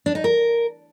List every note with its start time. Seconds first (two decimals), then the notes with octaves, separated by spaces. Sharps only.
0.06 D4
0.15 D#4
0.24 A#4